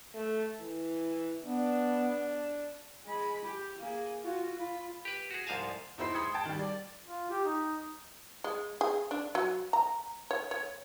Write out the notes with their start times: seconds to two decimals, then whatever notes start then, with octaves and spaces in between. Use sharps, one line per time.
0.14 A3
0.60 E3
1.44 B3 D4
3.06 G#3 B5
3.44 G4
3.78 A#3 G#4
4.22 F4 F#4
4.56 F4 B5
5.05 G4 B4
5.31 F#4 G#4
5.47 C2 G#2 F3 F5 G#5 A5
5.98 E2 D#4 E4 C5 B5 C7
6.14 B5 C6 D#6 G#6 C#7
6.34 G5 A5
6.45 D#3 G3
6.59 D5
7.04 F4
7.31 G4
7.45 D#4
8.44 G#3
8.81 G#4
9.11 D4
9.35 F#3
9.73 A#5
10.31 C#5
10.51 C#5